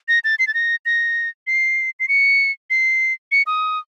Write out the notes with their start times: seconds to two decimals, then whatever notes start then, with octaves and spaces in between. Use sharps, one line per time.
0.08 A#6
0.24 A6
0.39 C7
0.47 A6
0.54 A#6
0.86 A#6
1.47 C7
2.00 C7
2.08 C#7
2.70 C7
3.32 C#7
3.47 D#6